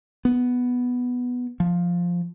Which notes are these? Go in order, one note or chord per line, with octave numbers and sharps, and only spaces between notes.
B3
F3